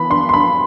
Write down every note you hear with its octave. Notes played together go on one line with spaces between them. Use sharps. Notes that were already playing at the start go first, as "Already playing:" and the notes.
Already playing: E3 B3 B5
D4 C6
C6
D4 B5